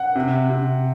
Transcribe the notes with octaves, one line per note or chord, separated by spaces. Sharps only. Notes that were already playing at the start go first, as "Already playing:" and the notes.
Already playing: F#5
C3
C3